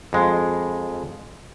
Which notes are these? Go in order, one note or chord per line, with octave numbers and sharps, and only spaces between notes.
F2 G#3